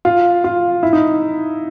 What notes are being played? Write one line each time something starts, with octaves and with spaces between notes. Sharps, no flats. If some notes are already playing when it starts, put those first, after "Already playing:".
F4
F4
E4
D#4